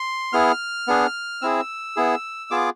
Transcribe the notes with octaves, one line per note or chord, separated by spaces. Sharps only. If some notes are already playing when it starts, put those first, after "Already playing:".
Already playing: C6
B3 E4 G#4 F6
B3 D4 G#4
C4 E4 G#4 E6
B3 E4 G#4
B3 F4 G#4 D6